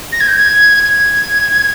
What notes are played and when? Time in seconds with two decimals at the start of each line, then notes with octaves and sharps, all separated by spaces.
0.13 A#6
0.20 G#6
0.28 G6
0.36 G#6
0.83 G#6